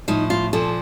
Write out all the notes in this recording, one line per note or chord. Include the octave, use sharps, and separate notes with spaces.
A2 F3 D#4
F4
A#2 F3 A4